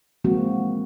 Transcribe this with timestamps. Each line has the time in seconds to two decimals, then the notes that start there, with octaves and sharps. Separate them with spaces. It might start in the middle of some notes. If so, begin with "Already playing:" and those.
0.24 E3 F3 G#3 A#3 C4 F#4